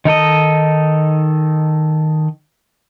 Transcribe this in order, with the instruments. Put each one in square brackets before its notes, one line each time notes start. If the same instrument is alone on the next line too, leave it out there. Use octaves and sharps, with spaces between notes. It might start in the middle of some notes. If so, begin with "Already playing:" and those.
[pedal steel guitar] D#3 D#4 A4 D#5